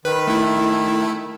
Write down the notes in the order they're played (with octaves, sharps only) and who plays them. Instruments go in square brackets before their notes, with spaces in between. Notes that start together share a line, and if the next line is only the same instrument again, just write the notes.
[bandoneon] D#3 [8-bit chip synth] B4
[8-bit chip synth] A3 E4